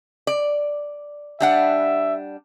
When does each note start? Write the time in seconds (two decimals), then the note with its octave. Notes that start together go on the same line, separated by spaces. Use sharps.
0.27 D5
1.40 G3 D4 E5 F#5